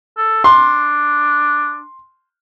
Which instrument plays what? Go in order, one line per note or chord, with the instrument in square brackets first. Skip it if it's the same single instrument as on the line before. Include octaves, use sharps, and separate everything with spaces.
[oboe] A4
[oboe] D4 [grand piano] C6